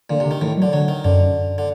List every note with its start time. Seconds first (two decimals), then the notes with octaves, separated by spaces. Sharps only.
0.10 A#2 D3
0.20 C3
0.26 D3
0.31 D#3
0.41 A2 D#3
0.57 F#3
0.62 D3
0.73 D3 F#3
0.88 D#3
1.04 F#2 D3
1.58 D3